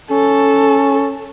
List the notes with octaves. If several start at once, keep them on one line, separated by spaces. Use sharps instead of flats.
C#4 A4